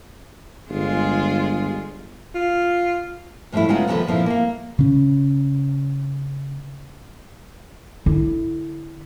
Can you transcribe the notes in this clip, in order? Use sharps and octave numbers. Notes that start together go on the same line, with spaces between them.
G1 G#3 F4 G#4
F4
A2 F3 G3 A3 E4
C#3 G#3 B3 D#4 F4 F#5
D#2 C3 F3 D#4 A4 B4
A#2 F3 C4 E4
A#3 F5
C#3 C#4
D3 E4